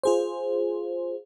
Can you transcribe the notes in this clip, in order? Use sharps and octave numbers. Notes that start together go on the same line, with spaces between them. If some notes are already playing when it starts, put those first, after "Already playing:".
F4 G#4 C5